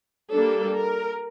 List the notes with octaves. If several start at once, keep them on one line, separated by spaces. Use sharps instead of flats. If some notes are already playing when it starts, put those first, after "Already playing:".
G3 A#3 D4 A4
A#4